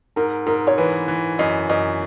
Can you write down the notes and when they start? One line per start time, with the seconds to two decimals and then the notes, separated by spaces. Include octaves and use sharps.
0.16 G#2 A#4
0.46 G#2 A#4
0.67 C#5
0.78 E3 B4
1.08 E3
1.38 F#2 D#5
1.69 F#2 D#5